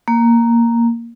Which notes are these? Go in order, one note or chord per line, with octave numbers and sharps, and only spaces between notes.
A#3